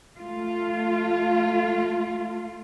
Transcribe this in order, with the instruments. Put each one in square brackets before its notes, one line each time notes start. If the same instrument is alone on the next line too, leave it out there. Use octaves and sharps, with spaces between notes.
[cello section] A3 F4